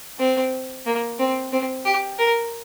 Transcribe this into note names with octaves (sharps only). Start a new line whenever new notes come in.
C4
A#3
C4
C4
G4
A#4